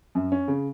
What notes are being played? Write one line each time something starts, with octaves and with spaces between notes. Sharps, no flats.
F#2
C#4
C#3